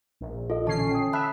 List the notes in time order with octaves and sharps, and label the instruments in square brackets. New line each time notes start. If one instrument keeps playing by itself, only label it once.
[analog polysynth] A#1
[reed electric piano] F4 D#5 [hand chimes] A4
[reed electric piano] A#2 D3 E3 [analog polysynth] C#4 C7 [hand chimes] A5
[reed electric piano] G5 D#6
[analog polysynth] E5 [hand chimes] A5 B5 F#6